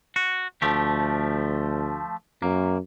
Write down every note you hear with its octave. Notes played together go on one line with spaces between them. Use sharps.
F#4
D2 F3 A3 G4
F#2 A#3